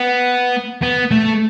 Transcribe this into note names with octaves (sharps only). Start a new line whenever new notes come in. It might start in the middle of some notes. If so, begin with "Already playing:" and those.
Already playing: B3
B3
A3